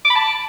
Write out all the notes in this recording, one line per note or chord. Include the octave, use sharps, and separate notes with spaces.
D6
B5
A5